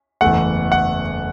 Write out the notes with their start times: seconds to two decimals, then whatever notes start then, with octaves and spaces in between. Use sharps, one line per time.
0.21 F#1 E2 E3 A3 F#5
0.72 F#5